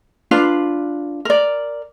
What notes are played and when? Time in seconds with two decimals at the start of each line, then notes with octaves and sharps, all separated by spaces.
0.31 D4 F4 B4
1.25 A#4 D5